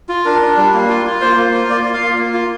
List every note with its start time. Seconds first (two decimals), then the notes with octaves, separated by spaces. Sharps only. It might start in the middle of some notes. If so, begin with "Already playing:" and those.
0.09 F4
0.25 D4 A#4
0.42 D4
0.57 G3
0.74 A#3
0.89 F4
1.06 F4
1.21 A#3 C5
1.37 A#3
1.53 F4
1.69 A#3 D5
1.85 F4
1.94 F5
2.02 A#3
2.18 A#3
2.34 F4